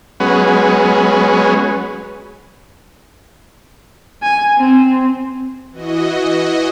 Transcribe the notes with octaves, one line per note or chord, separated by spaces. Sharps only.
F#3 G#3 B3 C#4
G#5
C4
E3 F#4 D#5